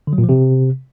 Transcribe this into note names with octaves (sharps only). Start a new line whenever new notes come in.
D3
F#3
A#2
F3
C3